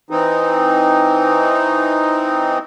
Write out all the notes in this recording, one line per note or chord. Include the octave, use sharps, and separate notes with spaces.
E3 C4 D#4